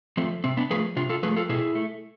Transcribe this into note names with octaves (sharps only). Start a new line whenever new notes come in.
F3 A3 C4
C3 C4
B3 D4
F3 A3 G#4 B4
C3 D4 F4
F4 A4
F3 A3 G#4 B4
F4 A4
B2 E4 G#4
A3